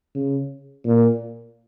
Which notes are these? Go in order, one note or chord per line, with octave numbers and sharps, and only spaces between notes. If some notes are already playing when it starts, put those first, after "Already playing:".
C#3
A#2